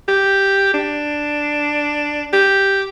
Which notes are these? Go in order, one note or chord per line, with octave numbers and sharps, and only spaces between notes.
G4
D4
G4